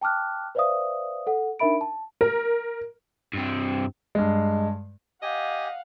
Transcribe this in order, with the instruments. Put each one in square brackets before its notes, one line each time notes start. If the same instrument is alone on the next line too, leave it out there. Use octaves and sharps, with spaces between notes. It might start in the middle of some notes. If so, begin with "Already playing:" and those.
[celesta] G5 A5 D6 F6 F#6
B4 C5 D5 E5 F5 D#6
A4 F#5
D4 D#4 A#4 E5 B5 D7
A5
[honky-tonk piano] A#4
[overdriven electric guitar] G2 C4
[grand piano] G2 G#3
[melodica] G4 G#5 [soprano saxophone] D#5 [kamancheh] F5 F#5